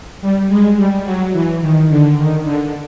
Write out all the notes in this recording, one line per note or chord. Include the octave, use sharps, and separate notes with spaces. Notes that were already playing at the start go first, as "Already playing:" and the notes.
G3
G#3
G3
F#3
E3
D#3
D3
D#3
D3